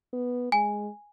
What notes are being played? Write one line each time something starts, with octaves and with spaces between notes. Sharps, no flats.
B3
G#3 G#5